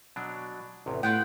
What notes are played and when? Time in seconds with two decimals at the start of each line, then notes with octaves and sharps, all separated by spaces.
0.16 B2 F#3 D4
0.86 A1 E2 C3
1.03 A2 B3 F4 F#5 G5